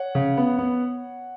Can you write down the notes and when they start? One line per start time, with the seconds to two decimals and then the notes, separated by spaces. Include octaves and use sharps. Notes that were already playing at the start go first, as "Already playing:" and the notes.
Already playing: C#5 F#5
0.15 C#3
0.37 B3
0.59 B3